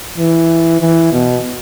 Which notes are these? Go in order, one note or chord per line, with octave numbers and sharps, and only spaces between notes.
E3
E3
B2